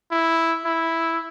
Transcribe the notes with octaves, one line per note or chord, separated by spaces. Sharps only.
E4
E4